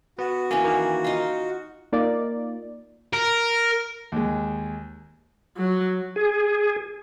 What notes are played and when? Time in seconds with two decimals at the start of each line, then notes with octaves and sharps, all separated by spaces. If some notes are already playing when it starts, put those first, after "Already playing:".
0.19 B3 F#4
0.51 E3 A#3 C#4
0.64 D#3 A#3
1.04 D#4 F4
1.92 A#3 D#4 F4 D5
3.13 A#4
4.12 D#2 G#3
5.57 F#3
6.16 G#4